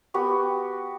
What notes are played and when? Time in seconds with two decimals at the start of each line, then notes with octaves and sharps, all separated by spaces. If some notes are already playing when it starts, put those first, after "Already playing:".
0.14 B3 F#4 G4